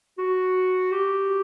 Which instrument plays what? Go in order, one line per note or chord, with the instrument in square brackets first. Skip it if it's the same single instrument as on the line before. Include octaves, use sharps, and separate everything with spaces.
[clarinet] F#4
G4